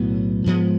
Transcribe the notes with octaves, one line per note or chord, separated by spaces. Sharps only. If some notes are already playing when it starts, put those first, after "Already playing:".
Already playing: B1 A2 F#3 B3
G#2 F3 G#3 B3